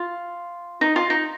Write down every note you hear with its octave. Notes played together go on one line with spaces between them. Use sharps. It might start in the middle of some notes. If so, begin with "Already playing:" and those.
Already playing: F4
D#4
F4
D#4